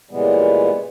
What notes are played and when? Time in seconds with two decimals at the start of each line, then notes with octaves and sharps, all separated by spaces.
0.11 A#2 C#3 E3 G3 G#3 B3